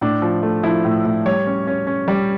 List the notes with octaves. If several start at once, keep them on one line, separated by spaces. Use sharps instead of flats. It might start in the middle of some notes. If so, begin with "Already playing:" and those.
A2 D4
F3
A3
F3 E4
A2
A2
G3 C#5
C#4
C#4
C#4
G3